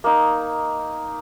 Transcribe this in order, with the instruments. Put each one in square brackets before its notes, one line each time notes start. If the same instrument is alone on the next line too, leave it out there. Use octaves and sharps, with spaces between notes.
[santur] A#3 D#4